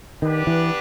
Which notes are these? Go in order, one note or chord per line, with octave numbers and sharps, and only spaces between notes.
D#3 B3 D4 G4 B4
E3